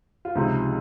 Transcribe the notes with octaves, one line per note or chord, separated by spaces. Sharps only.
F4
C#2 C3 F3 D#4